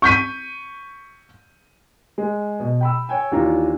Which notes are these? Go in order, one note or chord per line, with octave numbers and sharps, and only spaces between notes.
C#6 G6 B6 D#7
G#3
B2
G5 B5 E6
C#5 G5 G#5
D#2 E3 D4 F4 C#5 A#5